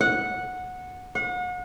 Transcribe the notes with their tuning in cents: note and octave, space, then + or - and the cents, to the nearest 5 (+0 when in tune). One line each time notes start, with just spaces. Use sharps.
F#5 -10
F#5 -35